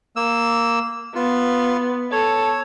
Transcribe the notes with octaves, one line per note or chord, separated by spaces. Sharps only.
A#3 E6
B3 F4
A4 C#5